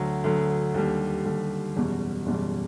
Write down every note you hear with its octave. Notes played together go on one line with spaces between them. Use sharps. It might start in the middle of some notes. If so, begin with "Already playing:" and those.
Already playing: D2 D3 F#3
D2 D3 F#3
D#2 D3 G3
D#2 D3 G3
F#1 E2 B2 G3
F#1 E2 B2 G3